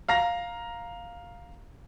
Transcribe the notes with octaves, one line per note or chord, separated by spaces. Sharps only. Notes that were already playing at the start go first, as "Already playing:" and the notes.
F5 A#5 A#6